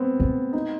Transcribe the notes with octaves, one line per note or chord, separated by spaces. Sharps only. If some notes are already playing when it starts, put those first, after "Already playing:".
Already playing: B3 C4
A3
D#4